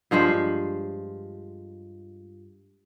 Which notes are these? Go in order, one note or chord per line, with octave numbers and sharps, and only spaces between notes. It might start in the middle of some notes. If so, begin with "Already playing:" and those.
G2 F3 G#3 C5